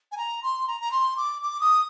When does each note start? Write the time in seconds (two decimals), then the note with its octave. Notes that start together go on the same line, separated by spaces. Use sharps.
0.12 G#5
0.17 A#5
0.43 C6
0.67 A#5
0.81 A#5
0.92 C6
1.17 D6
1.42 D6
1.61 D#6